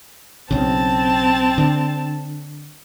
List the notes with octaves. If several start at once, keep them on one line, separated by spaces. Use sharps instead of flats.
B1 C#3 C4 A5
D3